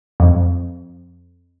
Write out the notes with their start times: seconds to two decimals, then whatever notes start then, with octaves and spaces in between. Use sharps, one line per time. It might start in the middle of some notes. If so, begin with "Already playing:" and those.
0.20 F2